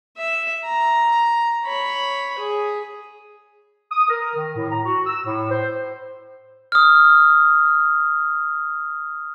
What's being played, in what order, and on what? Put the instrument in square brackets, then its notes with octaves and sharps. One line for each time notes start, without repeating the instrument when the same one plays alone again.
[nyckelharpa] E5
A#5
C#5 B5
G#4
[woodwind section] D#6
A#4
D#3
A2
A#5
F#4
E6
A2
C5
[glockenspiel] D#6 F6